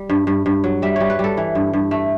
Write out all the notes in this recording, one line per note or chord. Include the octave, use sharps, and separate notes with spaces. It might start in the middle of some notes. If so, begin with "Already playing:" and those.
Already playing: G3
G2
G2
G2
F#3
G3 E5
G3 C#5
B4
G3 A4
E3
G2
G2
A3